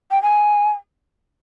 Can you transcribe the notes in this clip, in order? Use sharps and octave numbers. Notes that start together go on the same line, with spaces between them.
G5
G#5